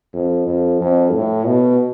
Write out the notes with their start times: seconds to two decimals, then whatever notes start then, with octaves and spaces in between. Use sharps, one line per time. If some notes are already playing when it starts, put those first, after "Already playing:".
0.14 F2
0.46 F2
0.81 F2
1.14 A2
1.46 B2